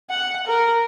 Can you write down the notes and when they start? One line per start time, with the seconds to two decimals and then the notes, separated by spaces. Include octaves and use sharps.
0.10 F#5
0.47 A#4